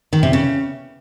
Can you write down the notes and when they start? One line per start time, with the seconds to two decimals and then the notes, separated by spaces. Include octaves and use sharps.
0.13 D#3
0.23 C3
0.33 C#3